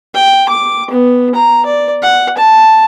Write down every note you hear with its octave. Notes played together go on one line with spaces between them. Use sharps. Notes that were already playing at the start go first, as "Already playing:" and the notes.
G5
D6
B3
A#5
D5
F#5
A5